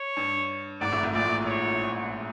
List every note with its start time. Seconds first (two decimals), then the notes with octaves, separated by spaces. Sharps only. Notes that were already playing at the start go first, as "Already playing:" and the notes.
Already playing: C#5
0.17 G2
0.81 G#1 G#2 D5
0.92 A1 A2
1.03 A1 A2
1.13 A#1 A#2 D5
1.46 C#5